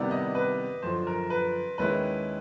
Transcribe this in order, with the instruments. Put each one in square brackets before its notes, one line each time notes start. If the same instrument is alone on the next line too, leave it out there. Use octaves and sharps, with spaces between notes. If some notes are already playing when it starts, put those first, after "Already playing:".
Already playing: [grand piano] C3 D#3 G3 B3 E4 [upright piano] D5
[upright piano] D#5
B4
[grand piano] F#2 D3 F3 [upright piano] C5
[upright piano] A#4
B4
[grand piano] D#2 D#3 G#3 C#4 E4 [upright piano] B4